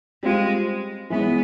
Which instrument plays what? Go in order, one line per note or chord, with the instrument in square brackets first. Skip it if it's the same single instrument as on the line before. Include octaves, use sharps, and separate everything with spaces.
[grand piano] G3 C4 F4 [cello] G#3
[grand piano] E3 G#3 C#4 [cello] B3